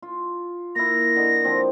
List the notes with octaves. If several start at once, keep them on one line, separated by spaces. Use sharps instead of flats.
F4
A#3 E4 A#6
D3 D#4
F3 C4